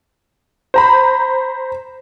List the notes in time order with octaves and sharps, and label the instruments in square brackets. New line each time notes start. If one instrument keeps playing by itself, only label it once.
[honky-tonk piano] C5 A#5 B5